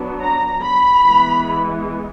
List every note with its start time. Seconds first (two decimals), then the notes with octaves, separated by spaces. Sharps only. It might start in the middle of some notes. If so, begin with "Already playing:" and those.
Already playing: F#3 B3 D4
0.21 A#5
0.62 B5
1.04 E3 G#3 B3